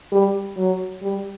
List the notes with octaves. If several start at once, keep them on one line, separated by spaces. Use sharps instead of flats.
G3
F#3
G3